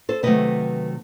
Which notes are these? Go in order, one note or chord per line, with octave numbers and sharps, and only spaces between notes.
A4 C5
C3 D#3 F#3 A3 B4 D#5